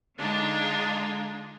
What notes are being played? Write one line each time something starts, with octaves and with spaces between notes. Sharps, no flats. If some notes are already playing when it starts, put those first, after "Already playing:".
D3 G#3 D4 D#4 F4